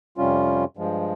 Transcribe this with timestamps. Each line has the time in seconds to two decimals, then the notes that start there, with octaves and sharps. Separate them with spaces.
0.17 F2 C3 G3 C#4 F4
0.77 G2 F3 G#3